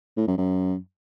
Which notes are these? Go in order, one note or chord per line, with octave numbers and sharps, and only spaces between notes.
A2
F#2
F#2